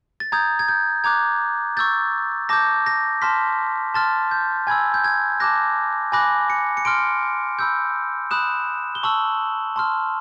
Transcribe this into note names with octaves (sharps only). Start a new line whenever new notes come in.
A6
A#5 D#6 G6 G#6
G#6
G6
A#5 D6 F#6 G#6
C#6 E6 G6 A6
A5 D6 G6 A#6
A#6
A5 C6 F6 B6
A5 C6 F6 A6
G6
G#5 B5 E6 G#6
G6
G#6
A5 D6 F#6 A#6
G#5 B5 D6 F#6 A#6
C#7
C#7
C6 F6 D7
B5 E6 G6
B5 D#6 F#6 E7
G7
A5 C#6 E6 F#7
A5 C6 F6